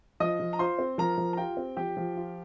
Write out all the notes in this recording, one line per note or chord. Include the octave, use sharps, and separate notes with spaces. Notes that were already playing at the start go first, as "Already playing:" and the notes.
F3 D#5 D#6
F3
A#5
F4 C5 C6
C4
F3 A#4 A#5
F3
A#5
F4 G4 G5
C4
F3 G4 G5
F3
F4